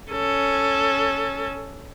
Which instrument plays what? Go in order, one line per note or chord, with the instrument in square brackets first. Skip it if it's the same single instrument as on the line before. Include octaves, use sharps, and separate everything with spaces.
[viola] C#4 A4